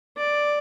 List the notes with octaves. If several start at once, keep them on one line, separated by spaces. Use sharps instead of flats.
D5